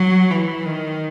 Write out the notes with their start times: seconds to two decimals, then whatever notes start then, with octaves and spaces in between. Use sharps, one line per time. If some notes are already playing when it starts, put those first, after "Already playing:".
Already playing: F#3
0.30 E3
0.65 D#3